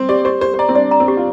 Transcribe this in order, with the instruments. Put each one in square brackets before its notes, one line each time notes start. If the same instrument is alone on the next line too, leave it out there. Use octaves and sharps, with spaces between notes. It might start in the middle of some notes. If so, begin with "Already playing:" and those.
Already playing: [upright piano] C4 C5
[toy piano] G4 [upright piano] D5
[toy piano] G4 [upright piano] C5
[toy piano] G4 [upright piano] C5
[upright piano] C5
[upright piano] D5 [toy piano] A#5
[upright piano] C4
[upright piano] D4 [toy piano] D5
[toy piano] A#5
[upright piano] C4
[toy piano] G4
[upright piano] F4